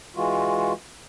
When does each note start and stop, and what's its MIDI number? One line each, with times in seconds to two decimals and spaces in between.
0.16 0.73 52
0.16 0.73 56
0.16 0.73 65
0.16 0.73 66